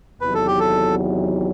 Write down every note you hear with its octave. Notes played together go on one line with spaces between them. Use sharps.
E2 C3 D#3 F#3 B4
A4
G4
A4